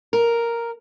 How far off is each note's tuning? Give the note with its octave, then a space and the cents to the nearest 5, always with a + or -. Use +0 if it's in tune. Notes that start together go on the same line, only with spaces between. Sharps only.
A#4 +0